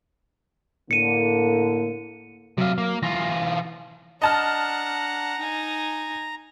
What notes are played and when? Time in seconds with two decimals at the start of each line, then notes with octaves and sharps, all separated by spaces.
0.91 A2 D3 A#3 C#7 D#7
2.58 C3 F#3 F5
2.78 A#3
3.03 E3 F4 A#6
4.22 D4 D#5 F#5 A5 A#5 F6
5.38 D#4 G#5